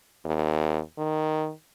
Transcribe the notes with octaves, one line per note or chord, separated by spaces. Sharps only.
D#2
D#3